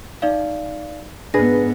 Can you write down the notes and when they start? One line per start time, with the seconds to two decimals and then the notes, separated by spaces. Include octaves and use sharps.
0.22 D#4 D5 F5
1.34 G#2 B3 D4 G#4 B4 A#6